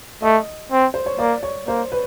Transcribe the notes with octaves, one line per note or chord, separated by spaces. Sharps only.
A3 D#5
C4
C5
C#5
A#3 D5
C#5
A#3 C5
B4